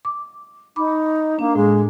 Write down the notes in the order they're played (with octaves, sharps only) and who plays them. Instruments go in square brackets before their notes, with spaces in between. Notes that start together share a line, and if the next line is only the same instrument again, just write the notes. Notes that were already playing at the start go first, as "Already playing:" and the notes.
[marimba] D6
[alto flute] D#4 [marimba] B5 D6
[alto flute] A#3 [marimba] D4
[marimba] A2 [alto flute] G#3